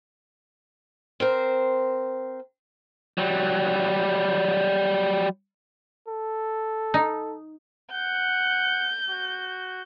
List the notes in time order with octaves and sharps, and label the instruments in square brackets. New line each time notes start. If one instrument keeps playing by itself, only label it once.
[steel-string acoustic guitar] C4 A#4 C5
[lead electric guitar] F#3 G3
[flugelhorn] A4
[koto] D#4
[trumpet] F#5 [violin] G6
[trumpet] F#4